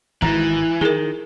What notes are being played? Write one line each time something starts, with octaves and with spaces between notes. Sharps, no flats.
G#1 G#2 E3 A#5
D#3 G#4 A#4